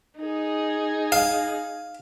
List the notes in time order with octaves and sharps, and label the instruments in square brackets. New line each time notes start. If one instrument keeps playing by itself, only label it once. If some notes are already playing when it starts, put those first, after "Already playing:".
[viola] D#4 G#4
[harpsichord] F5